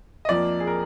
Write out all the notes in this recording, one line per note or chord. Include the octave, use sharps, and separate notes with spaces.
D#5
F2 F3 A#3 D5
G#4
A#4